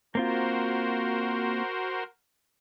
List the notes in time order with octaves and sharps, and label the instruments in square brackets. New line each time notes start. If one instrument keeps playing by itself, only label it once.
[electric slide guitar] A#3 C4 F4 [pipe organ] F#4 A#4 C5